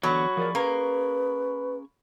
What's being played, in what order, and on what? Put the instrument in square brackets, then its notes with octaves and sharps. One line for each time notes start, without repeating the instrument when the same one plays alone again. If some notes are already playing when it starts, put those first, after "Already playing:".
[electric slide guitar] D3 E3 B3 [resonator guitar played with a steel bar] F#3 [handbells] B5 C#6
[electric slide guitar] F3 G#4 D5 [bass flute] A#4
[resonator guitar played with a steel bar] A#3 [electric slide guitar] C#4 G#4 A#5 [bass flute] B4